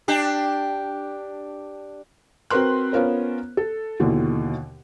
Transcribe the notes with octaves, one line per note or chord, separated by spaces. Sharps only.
D4 G4
C4 F#4 A#4 B4 C6 F#6
B3 C#4 F4 A#4 C5
A4
D#2 B2 D3 E3